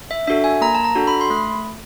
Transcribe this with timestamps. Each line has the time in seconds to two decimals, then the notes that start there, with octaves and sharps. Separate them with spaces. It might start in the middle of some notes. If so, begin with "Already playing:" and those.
0.11 E5
0.27 D4 F#4 A4 E5
0.44 G#5
0.61 A#3 A#5
0.75 A5
0.84 A#5
0.96 D4 F#4 A4
1.07 B5
1.21 C6
1.30 A3 B5